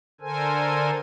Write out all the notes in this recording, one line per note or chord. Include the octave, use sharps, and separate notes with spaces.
D3 A4 A#4 C5 G#5